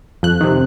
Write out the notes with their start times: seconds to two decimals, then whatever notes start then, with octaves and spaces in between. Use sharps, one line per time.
0.23 F2 F#6
0.41 C3 D#3